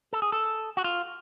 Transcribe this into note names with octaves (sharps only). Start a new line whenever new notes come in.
A4
G#4
A4
F#4
F4